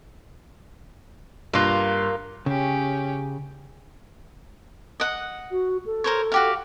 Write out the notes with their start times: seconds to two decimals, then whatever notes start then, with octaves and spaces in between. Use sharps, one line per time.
1.54 G2 A#3 F4 C6 F#6
2.46 C#3 C#4 G4
5.00 D#5 F#5
5.51 F#4
5.86 A4
6.04 A#4 C5 C#5
6.32 F#4 G4 F5